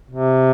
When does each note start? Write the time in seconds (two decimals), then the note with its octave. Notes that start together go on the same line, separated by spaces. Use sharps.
0.11 C3